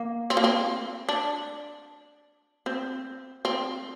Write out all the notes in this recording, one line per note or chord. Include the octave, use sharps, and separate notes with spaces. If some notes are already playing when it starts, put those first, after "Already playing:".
Already playing: A#3
C4
A#3
C4
D4
C4
C4